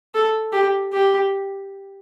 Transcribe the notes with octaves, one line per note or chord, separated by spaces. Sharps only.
A4
G4
G4